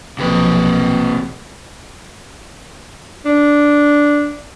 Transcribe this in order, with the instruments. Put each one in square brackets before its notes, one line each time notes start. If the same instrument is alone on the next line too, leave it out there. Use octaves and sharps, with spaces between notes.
[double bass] B1 F3 [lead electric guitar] C3 B4
[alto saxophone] D4